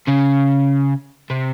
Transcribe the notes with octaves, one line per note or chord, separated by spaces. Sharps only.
C#3
C3